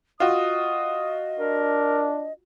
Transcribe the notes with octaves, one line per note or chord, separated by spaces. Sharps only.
F4 F#4 D#5 D#6
D4 A#4